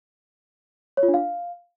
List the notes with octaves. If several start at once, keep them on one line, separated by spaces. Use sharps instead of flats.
C#5
F4
D4
F5